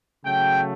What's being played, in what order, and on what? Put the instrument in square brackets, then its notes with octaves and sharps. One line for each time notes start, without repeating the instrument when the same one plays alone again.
[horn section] C#3 F#3 A3 G5